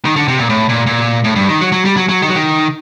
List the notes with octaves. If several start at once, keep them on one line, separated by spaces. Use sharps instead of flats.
D#3
D3
C3
A#2
A2
A#2
A#2
A2
G2
D#3
F#3
F#3
G3
F#3
F#3
D#3
F#3
D#3